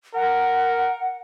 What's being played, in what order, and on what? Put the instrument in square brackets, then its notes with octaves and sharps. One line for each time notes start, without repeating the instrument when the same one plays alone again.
[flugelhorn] A#4 [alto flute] F#5